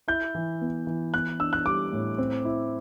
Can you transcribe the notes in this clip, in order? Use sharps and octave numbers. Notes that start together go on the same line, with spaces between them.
E4 G6
E3
B3
E3
B3 F#6
D4 E6
F#6
G3 D6
A2
C4
E4